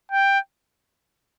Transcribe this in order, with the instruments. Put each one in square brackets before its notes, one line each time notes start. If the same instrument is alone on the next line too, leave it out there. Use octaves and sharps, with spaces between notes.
[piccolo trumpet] G5